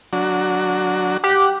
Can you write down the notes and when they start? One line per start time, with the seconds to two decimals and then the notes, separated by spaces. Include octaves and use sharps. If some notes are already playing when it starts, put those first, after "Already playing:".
0.13 F#3 D4 F#4
1.24 G4 F#5